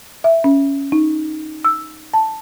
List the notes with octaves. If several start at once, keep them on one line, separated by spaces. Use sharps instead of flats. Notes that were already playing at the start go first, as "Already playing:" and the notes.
E5
C#4
D#4
E6
A5